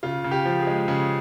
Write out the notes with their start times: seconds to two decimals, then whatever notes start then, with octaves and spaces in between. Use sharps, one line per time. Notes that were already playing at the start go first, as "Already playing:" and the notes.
0.03 C#3 F4
0.24 C#3
0.31 G4
0.45 F3
0.60 G#4
0.67 G#3
0.88 C#3 G#4